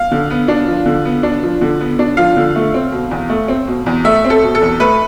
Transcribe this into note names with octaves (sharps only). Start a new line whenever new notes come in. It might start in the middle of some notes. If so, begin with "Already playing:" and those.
Already playing: F5
D3
B3
D4
F3
D3
B3
D4
F3
D3
B3
D4
F3 F5
D3
A3
C4
B2
E2
A3
C4
B2
E2
A3 E5
C4
A4
B2
A4
E2
A3 B4